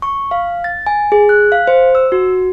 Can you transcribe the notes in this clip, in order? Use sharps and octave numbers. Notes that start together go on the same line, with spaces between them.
C#6
F5
A6
G#5
G#4
F#6
F5
C5
E6
F#4